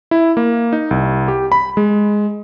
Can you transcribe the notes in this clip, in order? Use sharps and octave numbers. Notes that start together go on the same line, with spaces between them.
E4
A#3
D#4
C2
G4
B5
G#3